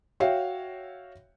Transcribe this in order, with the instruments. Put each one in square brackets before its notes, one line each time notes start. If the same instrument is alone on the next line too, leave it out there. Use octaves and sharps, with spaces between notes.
[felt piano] F#4 C#5 E5 F5 G5